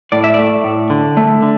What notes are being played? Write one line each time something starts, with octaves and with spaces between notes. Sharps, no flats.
A2 D5
E5
A3 D5
A2
D3
A3
D3